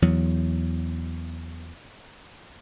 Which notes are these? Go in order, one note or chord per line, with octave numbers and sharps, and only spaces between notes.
E2 F#3